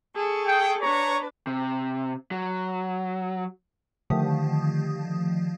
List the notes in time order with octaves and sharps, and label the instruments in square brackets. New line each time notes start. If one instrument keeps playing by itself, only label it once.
[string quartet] G#4 A4 C#6
[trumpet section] G5
[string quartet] D4 B4 A5 [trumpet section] C#5 A#5 C#6
[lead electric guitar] C3
F#3
[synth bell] D3 D#3 F3 A3 G4 D#6